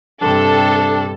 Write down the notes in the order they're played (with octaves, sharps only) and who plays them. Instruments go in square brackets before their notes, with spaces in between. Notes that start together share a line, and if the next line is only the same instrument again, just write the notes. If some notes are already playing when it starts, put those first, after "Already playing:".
[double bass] G2 C3 [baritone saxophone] D4 [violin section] A4